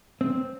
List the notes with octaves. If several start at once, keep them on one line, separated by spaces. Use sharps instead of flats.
C4